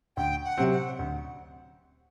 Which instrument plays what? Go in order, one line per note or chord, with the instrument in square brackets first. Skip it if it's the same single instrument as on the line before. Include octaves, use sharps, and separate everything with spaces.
[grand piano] D2 [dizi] G5
[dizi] F#5
[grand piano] C3 F#3 C4
[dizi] F#5
[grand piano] D2